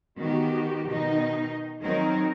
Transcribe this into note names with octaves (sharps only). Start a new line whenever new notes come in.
D#3 B3 F#4 G4
B2 D#3 D#4 D#5
D#3 F#3 C4 D#4 A#4